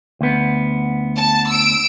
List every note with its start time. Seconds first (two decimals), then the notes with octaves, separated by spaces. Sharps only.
0.21 D2 B3
1.16 A5
1.49 E6 D7